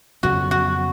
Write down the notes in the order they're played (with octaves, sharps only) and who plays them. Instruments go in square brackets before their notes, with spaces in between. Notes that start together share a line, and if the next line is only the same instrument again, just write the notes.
[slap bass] F2 C#3 F#3 B3 [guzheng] F#4
[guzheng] F#4